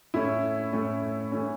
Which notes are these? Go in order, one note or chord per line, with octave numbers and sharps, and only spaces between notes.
A2 A3 C#4 E4
A2 A3 C#4
E3 A3 C#4